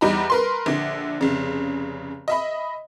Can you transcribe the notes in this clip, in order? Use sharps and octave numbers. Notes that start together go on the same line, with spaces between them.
E2 G3 D#4 A#5 B5
A#4 B4 C6
A#1 D3
F1 C#3
D#5 E5 B5